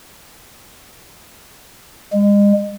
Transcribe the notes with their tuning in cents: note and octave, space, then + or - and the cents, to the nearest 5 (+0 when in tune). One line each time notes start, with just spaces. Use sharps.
G#3 -35